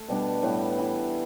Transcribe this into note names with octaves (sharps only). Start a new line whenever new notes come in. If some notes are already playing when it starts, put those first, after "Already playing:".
Already playing: A3
B2 G3 B3 D4
A2 G3 B3
E3 B3 E4